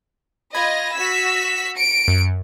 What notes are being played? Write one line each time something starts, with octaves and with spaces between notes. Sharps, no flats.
F4 D#5 B5 G#6 A#6
F#4 E6 B6
A#6
C#7 D7
F#2